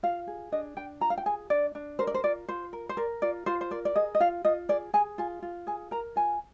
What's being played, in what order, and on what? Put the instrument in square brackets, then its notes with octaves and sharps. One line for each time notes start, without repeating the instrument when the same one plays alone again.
[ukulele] F4 F5
G#4
D4 D#5
D4 G5
F4 A#5
F5
G5
G#4 G#5
D4 D5
D4
A#4 C5
D5
C5
F4 D5
F4 C5
A#4
C5
A#4 D5
F4 D5
F4 C5
C5
A#4 D5
D5
G#4 D#5
D#5
F4 F5
F4 D#5
G#4 D5
G#4 G#5
F4 G#5
F4
G#4 G#5
A#4 A#5
F4 G#5